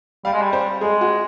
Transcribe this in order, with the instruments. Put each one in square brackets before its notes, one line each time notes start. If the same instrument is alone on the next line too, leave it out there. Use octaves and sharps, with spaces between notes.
[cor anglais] G3 [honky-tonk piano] F5
[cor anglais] G#3
G3
[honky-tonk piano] C5
[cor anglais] G#3 [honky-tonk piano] G#4
[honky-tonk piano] F#4